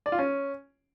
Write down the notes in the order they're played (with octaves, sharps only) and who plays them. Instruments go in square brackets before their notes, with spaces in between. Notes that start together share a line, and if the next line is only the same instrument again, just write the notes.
[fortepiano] D5
F4
C#4